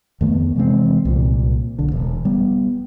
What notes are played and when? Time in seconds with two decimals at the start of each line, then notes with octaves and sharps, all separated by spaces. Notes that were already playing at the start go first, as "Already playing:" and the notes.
0.21 F2 D#3 A3 B3
0.56 C3 E3 G#3 C4
1.05 C2 A#2
1.79 B1 D3
1.92 E1
2.25 G3 B3